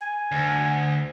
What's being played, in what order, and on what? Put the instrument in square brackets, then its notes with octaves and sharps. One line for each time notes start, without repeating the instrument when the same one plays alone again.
[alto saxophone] G#5
[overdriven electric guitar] D2